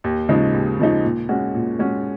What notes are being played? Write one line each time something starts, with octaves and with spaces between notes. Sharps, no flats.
D#2
C#3 F3 G#3 D#4
D#2
C#3 F3 G#3 D#4
A#2
G#3 C#4 F#4
A#2
G#3 C#4 F#4